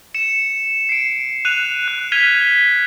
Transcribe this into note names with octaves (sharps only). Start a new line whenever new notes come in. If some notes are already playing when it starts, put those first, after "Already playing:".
C#7 E7
C7 D7
F#6 D#7 F7
F#6
F6 G#6 B6 D#7 F7 G7